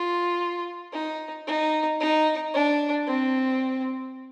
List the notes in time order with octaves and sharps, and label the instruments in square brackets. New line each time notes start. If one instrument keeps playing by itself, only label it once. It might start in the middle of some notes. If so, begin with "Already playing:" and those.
Already playing: [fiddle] F4
D#4
D#4
D#4
D4
C4